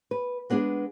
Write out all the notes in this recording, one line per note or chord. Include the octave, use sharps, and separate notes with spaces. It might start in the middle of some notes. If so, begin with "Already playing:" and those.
B4
G#3 B3 D4 G4 G#4